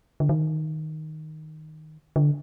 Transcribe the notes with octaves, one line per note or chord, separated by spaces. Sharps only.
D3
D#3
D3